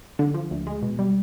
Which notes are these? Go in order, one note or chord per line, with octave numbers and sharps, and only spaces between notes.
D3
F3
D2
G#3
B2
G3